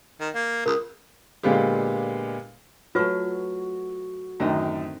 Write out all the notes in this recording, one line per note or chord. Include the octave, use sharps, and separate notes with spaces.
D#3
A#3
C#2 A#4 D#6
A#2 D3 G#3 B3 F4 G4
F#3 A3 F4 F#4 B4 C#6
F#2 A2 D3 D#3 C4 D#4